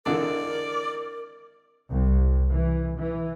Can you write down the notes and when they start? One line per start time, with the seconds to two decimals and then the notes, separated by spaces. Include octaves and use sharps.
0.06 G#1 D3 E3 A#4 D5
1.88 C2
2.49 E3
2.97 E3